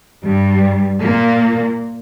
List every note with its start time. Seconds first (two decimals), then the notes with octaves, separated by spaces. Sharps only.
0.24 G2 G3
1.03 A#2 A#3